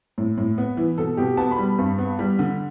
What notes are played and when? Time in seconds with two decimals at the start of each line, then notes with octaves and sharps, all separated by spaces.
0.18 A2
0.38 A2
0.58 B3
0.77 E3
0.98 B2 A4
1.17 B2 G4
1.37 B3 A5
1.51 B5
1.58 G3
1.78 G2
1.98 B3
2.19 G3
2.39 D3